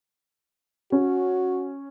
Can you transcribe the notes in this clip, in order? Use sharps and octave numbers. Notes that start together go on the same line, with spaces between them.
C#4 F#4